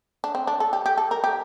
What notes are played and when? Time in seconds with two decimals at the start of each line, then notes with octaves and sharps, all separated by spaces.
0.24 D4
0.35 C4
0.47 D4
0.60 A4
0.73 G4
0.86 G4
0.98 A4
1.11 A#4
1.24 G4